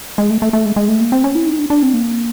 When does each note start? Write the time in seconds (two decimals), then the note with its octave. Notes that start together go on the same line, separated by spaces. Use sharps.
0.18 G#3
0.30 A3
0.42 A3
0.53 A3
0.65 G#3
0.76 G#3
0.88 A3
1.00 A#3
1.12 C4
1.24 C#4
1.35 E4
1.47 D#4
1.59 D4
1.70 D4
1.82 C4
1.93 A#3